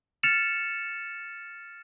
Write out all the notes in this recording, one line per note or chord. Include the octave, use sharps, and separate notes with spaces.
F6 A6 C#7 E7 F7